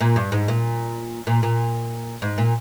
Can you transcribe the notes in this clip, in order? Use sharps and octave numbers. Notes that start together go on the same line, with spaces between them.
A#2
G2
G#2
A#2
A#2
A#2
G#2
A#2